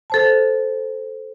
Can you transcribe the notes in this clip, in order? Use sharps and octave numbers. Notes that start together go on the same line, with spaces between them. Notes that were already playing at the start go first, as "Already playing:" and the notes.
A4 C5 A5